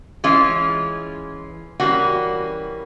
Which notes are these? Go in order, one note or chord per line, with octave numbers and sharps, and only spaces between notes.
E3 G#3 C#4 F4
E3 G3 A#3 C#4 F#4